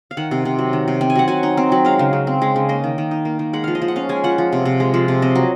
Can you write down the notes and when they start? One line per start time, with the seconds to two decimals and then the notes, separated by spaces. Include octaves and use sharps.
0.11 F5
0.17 D#3 F#5
0.31 C3
0.45 C3
0.59 F#3
0.73 D#3
0.88 C3
1.01 C4
1.10 G#5
1.15 F#3 F#5
1.28 F#3 G#5
1.43 D#4
1.57 C4
1.72 F#3
1.85 G#3 F5
1.99 C#3
2.13 C#3
2.27 C4
2.42 G#3
2.56 C#3
2.69 A#3 D#5
2.84 D#3
2.98 D#3
3.11 D#4
3.25 A#3
3.39 D#3
3.53 G#3 F#5
3.64 F3 F5
3.75 D#5
3.82 F3
3.88 F#5
3.96 C#4 F5
4.09 G#3 G#5
4.24 F3 F#5
4.38 F3
4.52 C3
4.65 C3
4.80 G#3
4.94 F3
5.08 C3
5.22 C4 D#5
5.35 F#3